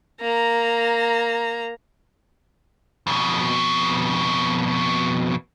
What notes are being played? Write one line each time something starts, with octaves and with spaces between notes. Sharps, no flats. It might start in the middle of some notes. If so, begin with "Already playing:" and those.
A#3 A#5
F2 B2